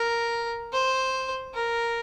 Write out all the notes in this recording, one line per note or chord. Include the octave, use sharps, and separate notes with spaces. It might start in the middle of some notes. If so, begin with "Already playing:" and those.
Already playing: A#4
C5
A#4